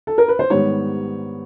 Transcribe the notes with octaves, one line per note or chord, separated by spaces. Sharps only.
A4
A#4
B4
C5
G#2 D#3 G3 B3 C#5